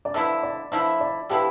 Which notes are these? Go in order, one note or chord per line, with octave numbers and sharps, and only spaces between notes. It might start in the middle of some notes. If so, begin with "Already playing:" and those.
D5
D3 F3 B3 E4 E5
D5
D3 F3 B3 E4 E5
D5
D3 F3 B3 E4 G4